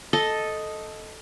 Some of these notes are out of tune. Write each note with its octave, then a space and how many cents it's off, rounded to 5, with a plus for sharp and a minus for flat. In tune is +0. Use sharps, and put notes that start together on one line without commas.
A4 -5 D#5 +0